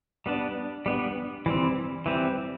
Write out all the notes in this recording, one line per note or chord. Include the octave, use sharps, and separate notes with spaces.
G3 B3 D4
G3 B3 D4
E3 G3 C4
E3 G3 C4